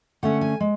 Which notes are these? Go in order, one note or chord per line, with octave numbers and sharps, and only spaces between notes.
D3 A3 C#4 F#5
G#5
G#3